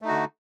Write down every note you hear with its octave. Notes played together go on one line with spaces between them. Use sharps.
D3 A3 D#4 F#4